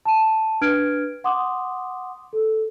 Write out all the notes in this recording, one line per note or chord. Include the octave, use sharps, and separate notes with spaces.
A5 D#7
D4 B4 F6 G#6 D7
F#5 C6 D6 D#6
A4